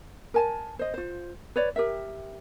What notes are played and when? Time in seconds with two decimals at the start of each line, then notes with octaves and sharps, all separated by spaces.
0.34 A#4 G#5 A5
0.79 C5 D#5
0.94 F4 C5
1.56 B4 C#5 D5
1.76 G4 A#4 E5